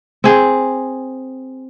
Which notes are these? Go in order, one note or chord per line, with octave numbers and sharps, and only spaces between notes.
C4 G#4